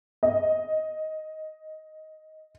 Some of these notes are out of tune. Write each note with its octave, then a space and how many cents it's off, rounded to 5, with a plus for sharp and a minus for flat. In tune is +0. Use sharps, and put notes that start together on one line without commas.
D#5 +5